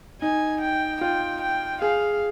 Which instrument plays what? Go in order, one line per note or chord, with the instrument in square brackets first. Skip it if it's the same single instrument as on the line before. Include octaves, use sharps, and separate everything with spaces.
[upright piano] D#4 [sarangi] G#5
[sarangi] G5
[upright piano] F4 [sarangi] G5
[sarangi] G5
[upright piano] G#4 [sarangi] F5